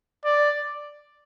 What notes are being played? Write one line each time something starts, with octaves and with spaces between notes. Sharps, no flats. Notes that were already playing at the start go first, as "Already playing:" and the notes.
D5